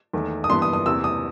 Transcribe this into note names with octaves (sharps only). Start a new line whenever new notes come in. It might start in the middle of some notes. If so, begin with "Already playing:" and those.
E2 D#3 A3
D#6
G2 E3 B3 C6
D#6
D#6
E2 C3 E3 E6
D#6